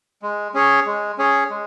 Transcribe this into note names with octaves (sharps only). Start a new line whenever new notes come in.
G#3
C#4 G#4 C#5
G#3
C#4 G#4 C#5
G#3